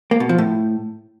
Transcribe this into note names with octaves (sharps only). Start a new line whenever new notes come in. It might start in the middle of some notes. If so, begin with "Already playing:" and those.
A#3
B2
F3
A2